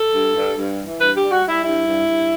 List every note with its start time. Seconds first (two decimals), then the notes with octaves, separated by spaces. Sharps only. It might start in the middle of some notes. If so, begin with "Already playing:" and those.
Already playing: A4
0.15 G2
0.36 G2
0.57 G2
0.78 E3
1.00 G2 B4
1.16 G4
1.22 G3
1.31 F#4
1.43 G3 E4
1.64 G2 E4
1.85 G2
2.07 G2